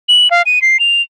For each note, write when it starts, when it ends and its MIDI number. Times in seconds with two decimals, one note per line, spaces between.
0.09 0.28 102
0.31 0.42 77
0.46 0.61 99
0.62 0.80 96
0.80 1.02 101